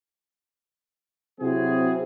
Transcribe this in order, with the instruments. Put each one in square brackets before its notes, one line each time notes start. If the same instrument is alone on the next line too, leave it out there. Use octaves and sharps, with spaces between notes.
[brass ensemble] C3 F#3 C4 E4 F#4 G#4